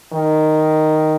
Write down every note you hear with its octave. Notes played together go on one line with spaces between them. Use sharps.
D#3